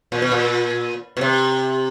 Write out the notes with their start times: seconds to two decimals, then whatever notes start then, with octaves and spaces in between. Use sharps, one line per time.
0.12 A#2
0.22 B2
0.32 A#2
1.17 B2
1.21 C3